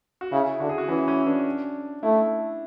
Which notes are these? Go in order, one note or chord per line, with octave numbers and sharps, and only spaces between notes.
F#4
C#3 E4
D3 F#4
G#4
F#4
E3 C#4
C#4
D4
A3 E4